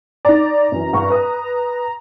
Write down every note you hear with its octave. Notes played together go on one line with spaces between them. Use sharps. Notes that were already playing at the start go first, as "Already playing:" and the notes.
D#4 D5 A#5
F#2 E3
G2 E4 C#6
B4 D#6